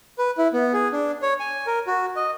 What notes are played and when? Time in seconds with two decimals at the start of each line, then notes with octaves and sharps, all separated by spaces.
0.18 B4
0.38 E4
0.53 B3
0.73 G#4
0.92 D4
1.22 C#5
1.40 G#5
1.67 A#4
1.87 F#4
2.16 D#5